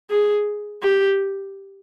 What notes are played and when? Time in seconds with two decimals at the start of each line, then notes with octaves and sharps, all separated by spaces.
0.10 G#4
0.82 G4